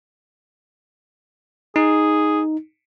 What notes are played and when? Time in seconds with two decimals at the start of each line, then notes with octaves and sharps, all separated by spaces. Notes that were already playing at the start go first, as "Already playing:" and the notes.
1.76 D#4 G#4